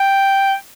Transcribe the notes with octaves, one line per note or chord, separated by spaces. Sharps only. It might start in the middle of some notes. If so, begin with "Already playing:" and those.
Already playing: G5